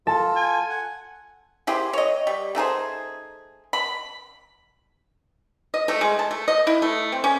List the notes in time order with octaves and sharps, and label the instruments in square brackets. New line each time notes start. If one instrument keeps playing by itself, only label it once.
[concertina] F4 A4 [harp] A5
[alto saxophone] G#5
[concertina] F#5
[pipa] E4 G4 G#4 C5
C#5 D#5
G3
A3 D#4 G#4 C5
B5
D#5
A3
G#3
A5
A3
D#5
E4
A3
C4
C#4